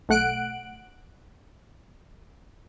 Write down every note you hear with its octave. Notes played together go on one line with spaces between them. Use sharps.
B1 A3 F#5 F#6 D7